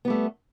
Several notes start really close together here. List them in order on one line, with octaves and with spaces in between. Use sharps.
B3 G3 A3